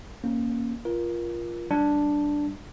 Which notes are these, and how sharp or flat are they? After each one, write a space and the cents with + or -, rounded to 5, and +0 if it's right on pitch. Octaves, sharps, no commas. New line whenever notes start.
A#3 +0 C#4 -15
F4 -10 A#4 +25
G3 +0 D4 +0